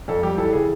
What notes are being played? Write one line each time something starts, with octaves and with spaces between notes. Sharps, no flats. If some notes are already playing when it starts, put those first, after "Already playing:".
F2 A4
G3 G4
E3 A4
C#3 G#4